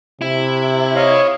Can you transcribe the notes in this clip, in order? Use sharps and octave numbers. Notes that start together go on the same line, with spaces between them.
C3 E4
C#5 D#5 F5